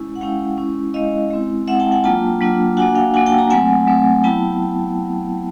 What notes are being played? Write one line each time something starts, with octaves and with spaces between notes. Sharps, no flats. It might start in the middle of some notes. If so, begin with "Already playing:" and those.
Already playing: G#3 C#4 E4
F#5
G#3 C#4 E4 F5 G5
G#3 C#4 E4
G#3 C#4 E4 D#5 F5
G#3 C4 E4
G#3 C4 E4 E5 F#5
G5 A5
F#5 G#5
F#3 A#3 D4 F4 G5 A5
F#3 A#3 D4 F4
A#3 D4 F#4 F#5 G#5
F5 G5
A#3 D4 F#4 F#5 G#5
G5 A5
G#5 A#5
F#3 A3 C4 F#5 G#5
F#3 A3 C4
F#3 B3 E4 G5 A5